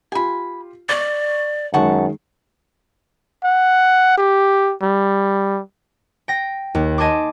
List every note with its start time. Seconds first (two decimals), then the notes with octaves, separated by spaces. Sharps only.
0.12 F4 G4 G#5 B5
0.89 D5 C#6 D6 A6
1.74 F#2 D#3 G#3 F#5 A5 C#6
3.44 F#5
4.18 G4
4.82 G3
6.28 G5 A#6
6.75 D#2
6.98 D#5 G#5 A5 C6 D6